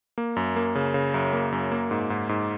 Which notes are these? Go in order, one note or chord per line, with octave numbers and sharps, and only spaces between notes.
A#3
F#2
A#3
C#3
C#3
F#2
A#3
F#2
A#3
G#2
G#2
G#2